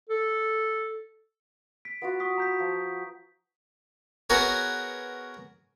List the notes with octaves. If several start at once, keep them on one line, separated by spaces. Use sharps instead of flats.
A4
B6 D7
B3 F4 F#4
C#6 D#6 B6
A#5 G6 B6
F3
B3 F#4 G#4 A#4 C#5